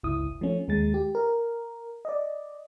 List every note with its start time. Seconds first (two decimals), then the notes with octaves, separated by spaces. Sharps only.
0.03 G1 C#2 E4 D#6
0.41 F3 A3 C#4
0.68 D#2 G#3 A6
0.94 G4
1.15 A#4
2.05 D5 D#5